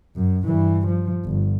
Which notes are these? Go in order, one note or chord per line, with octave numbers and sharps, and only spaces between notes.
F#2
G2 E3
F3
G1